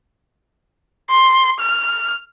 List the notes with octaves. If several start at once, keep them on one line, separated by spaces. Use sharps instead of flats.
C6
F6